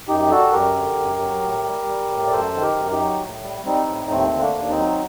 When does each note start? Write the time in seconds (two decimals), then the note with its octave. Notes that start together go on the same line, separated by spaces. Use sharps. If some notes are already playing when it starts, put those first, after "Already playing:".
0.08 F#2 D#4 G4
0.20 G4
0.30 G3 F#4 A4
0.52 F#2 G4 A#4
0.75 D3
0.98 F#2
1.20 F#3
1.42 A2
1.65 G3
1.87 G3
2.10 A2
2.27 D5
2.31 F#2 A4 C5
2.55 D#3
2.61 G4 A#4
2.76 F#2
2.91 D#4 G4
2.99 F#3
3.22 A2
3.44 G3
3.65 G3 C4 D#4
3.88 A2
4.11 D#2 A3 C4
4.33 D3
4.40 A#3 D4
4.55 D#2
4.70 C4 D#4
4.78 F#3